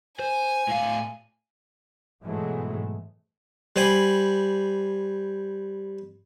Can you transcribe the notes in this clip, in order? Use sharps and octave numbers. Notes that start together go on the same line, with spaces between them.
C5 G#5
A2 F5
G#2 B2 E3 F#3 G#3 A3
G3 C5 G#5 B5